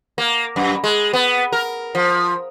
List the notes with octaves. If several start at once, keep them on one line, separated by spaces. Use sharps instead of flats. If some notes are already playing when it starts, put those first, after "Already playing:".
A#3
F#2
G#3
B3
A#4
F3